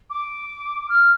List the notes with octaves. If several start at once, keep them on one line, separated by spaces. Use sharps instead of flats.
D6
F6